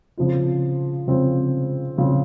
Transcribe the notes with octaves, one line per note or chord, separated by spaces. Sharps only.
C#3 F3 C4 F4
C#3 F3 C4 F4
C#3 F3 C4 F4